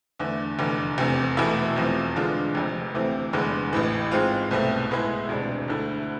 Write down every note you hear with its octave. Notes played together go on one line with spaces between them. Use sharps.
E2 D3 A3
F1 E2 D3
F1 E2 C3
E1 E2 B2 A3 E4
F1 E2 C3 F3
E2 D3 G#3 D4 F4
F1 F2 C3
D2 C3 E3 A3 C4
F1 E2 D3 G#3 B3
A1 A2 E3
G#2 G#3 C4 F4
C2 B2 A3 C4
A2 G#3 B3 E4 G#4
E1 D2 C3 G#3 D4
D2 D3 A3 E4